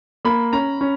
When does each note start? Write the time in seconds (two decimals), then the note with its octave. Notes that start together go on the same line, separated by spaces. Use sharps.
0.25 A#3 B5
0.53 C#4 A#5
0.81 C#4